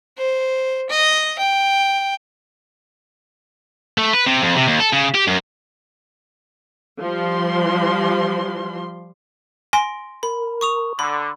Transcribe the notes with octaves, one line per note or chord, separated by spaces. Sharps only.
C5
D#5
G5
A3
B4
C3
F2
C3
D#2
A4
C#3
G4
F#2
F3 G3 C6
G#5 C6 A#6 D7
A#4 B5
C#6 D#6 F7
D3 B5